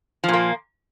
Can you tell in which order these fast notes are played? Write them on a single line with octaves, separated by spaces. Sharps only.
F3 A#2 A#3